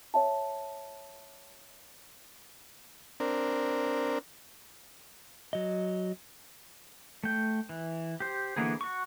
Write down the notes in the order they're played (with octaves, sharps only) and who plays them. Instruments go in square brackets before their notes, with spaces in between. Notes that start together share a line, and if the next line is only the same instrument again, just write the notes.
[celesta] C#5 E5 A5
[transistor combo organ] C4 D4 A#4
[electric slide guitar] F#3 D#5
[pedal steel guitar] A3 G5
E3
G4 C5
D3 E3 A#3 B3 G#4
F#4 C#6